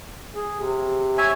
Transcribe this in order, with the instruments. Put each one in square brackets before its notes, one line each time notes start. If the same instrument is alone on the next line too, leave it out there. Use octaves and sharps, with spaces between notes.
[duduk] G#4
C3
[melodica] C#5 E5 G#5